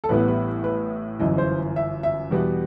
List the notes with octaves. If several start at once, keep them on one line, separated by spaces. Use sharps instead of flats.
A4
A1 A2 G3 B3 B4
B4
B4
G1 F#2 E3 D#5
C5
E5
E5
E2 B2 G3 B3